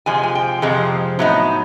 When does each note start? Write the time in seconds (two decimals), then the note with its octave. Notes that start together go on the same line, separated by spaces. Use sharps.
0.06 F2 C3 F3 G#3 G#5
0.23 G#5
0.35 G5
0.62 F2 C3 F3 G#3
1.19 A2 F#3 B3 D#4